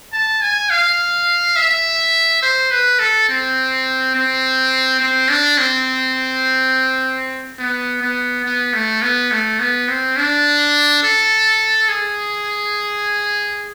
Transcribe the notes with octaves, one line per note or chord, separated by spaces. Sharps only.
A5
G#5
F5
E5
C5
B4
A4
C4
C4
C4
D4
C4
B3
B3
B3
A3
B3
A3
B3
C4
D4
A4
G#4